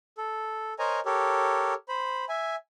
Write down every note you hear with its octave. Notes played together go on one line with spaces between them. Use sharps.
A4
A#4 C5 C#5 D#5 G#5 A#5
G4 A4 A#4 C#5
C5 B5
E5 G#5